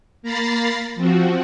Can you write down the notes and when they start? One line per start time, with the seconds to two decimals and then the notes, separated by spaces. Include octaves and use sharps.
0.23 A#3 A#5 B5 A6 C7
0.96 F3 C4 F#4